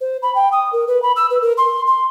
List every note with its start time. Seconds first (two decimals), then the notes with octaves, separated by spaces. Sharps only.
0.01 C5
0.23 B5
0.35 G5
0.52 D#6
0.73 A#4
0.88 B4
1.03 B5
1.16 E6
1.30 B4
1.42 A#4
1.58 C6
1.87 C6